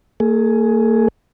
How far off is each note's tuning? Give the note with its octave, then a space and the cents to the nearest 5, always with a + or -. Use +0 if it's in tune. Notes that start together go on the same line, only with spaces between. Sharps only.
A#3 -40 G#4 +15